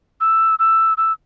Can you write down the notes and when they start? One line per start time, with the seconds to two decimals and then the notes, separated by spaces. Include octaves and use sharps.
0.21 E6
0.59 E6
0.97 E6